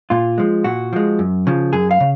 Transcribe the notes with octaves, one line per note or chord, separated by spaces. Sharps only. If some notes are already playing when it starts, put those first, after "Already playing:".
A#2 F4
F3 G#3
A#2 F#4
F3 G#3
F#2
C#3 F3
F#2 G#4
F5
C#3